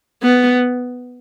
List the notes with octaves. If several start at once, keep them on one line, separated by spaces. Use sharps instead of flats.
B3